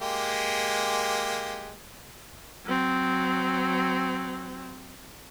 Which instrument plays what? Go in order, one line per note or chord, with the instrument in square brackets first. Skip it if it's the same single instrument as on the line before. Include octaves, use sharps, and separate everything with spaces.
[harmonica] G#3 A#3 G4
[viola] F#3 C4